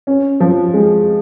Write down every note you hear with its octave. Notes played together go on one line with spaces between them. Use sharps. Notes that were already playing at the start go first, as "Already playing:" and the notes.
C#4
F3
G#3